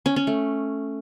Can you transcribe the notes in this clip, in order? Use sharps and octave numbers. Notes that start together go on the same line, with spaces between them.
C#4
C#4
A3